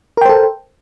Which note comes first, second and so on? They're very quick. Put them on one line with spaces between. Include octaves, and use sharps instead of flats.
A#4 G5 C5 A4